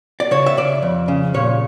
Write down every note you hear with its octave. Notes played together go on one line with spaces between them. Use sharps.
D5
C#3 C#5
E5
C#3 D5
F2
C#3
A#2 C#5